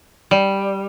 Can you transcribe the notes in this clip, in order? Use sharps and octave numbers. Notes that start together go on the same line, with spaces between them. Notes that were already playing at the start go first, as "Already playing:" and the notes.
G3